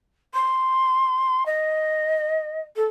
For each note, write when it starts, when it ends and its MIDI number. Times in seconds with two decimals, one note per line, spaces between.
0.34 1.44 84
1.46 2.61 75
2.76 2.84 69